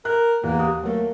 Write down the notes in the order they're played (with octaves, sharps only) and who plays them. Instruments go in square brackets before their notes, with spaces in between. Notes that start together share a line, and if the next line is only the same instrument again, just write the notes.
[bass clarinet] A#4 [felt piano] F#6
[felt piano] E2 [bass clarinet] A#3
[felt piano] D#2 D#6
[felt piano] F#3 A#3 [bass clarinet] A3